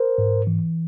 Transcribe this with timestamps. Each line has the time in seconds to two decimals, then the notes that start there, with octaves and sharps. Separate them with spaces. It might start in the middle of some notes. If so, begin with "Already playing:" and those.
Already playing: A#4 C5
0.18 G#2
0.47 E3